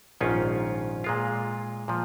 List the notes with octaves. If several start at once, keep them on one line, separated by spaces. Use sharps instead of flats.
A#1 G#2 D#3 C#4 F4
A#2 G#3 F4
A#2 F3